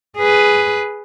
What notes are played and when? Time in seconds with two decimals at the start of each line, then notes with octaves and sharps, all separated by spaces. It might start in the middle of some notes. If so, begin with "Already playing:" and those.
0.18 G#4 B4